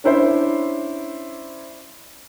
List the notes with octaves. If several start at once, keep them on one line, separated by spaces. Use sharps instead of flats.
C#4 D4 E4 C5